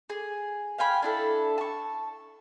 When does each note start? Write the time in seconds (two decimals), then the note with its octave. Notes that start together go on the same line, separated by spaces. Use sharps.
0.10 G#4
0.78 F5 G5 G#5 B5
1.02 D4 E4 A4
1.58 A5 C#6